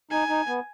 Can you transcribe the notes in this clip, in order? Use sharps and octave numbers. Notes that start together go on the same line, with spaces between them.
D#4 G#5
D#4
B3